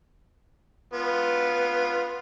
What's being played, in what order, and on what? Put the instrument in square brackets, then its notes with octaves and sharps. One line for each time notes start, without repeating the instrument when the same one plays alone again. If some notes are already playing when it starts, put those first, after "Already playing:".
[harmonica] B3 F4